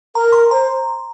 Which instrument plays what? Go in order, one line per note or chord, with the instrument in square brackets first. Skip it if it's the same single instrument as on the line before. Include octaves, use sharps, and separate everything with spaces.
[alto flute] A#4 [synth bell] A#5
[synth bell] C6
[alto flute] C5 [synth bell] A#5